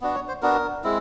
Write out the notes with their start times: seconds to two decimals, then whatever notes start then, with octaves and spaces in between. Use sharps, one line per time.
0.01 B3 D4 F#4
0.15 C#5
0.28 C5
0.42 B3 D4 F#4 A#4
0.84 G#3 C4 E4